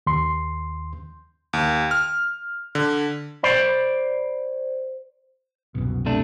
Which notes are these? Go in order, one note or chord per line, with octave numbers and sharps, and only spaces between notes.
D#2 C6
D#2
F6
D3
C5 D5 B5
C2 F#2 B2
C3 A3 D4